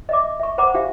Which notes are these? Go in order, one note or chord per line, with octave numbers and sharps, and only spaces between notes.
D#5 E5 D6
E5 C#6
C5 F#5 A#5 B5 D6
D4 G4 E5 F5